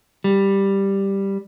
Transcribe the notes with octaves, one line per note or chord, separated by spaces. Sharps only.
G3